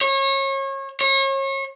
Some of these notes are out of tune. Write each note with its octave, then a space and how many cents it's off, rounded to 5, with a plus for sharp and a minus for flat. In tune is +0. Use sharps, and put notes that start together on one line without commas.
C#5 -30
C#5 -35